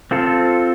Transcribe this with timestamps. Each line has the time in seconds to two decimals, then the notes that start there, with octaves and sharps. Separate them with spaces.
0.11 C4 F4 A4